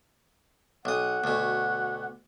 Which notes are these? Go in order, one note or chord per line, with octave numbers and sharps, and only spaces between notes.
B1 F#5 D#6
D2 B2